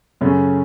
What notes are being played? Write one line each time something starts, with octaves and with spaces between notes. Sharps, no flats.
F#2 C#3 A3 C#4